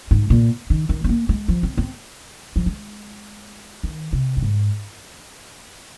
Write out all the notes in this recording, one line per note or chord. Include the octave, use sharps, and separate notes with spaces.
G#2
A#2
D#3
D#3
C4
A#3
G#3
F3
C4
C4
F3
G#3
D#3
C3
F2
G#2